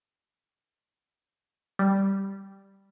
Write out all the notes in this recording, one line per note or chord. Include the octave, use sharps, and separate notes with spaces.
G3